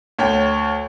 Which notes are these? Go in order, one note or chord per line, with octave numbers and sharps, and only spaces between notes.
D2 C#5 G5